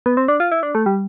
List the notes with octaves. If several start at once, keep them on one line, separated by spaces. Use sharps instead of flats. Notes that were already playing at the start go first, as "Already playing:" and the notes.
B3
C4
D4
F4
E4
D4
A3
G3